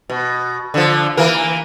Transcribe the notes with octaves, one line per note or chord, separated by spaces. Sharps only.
B2
D3 F3
E3 A#3 A#4